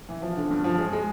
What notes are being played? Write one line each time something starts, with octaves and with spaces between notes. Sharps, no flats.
E3
F3
D3
G2
F3
G#3
G#3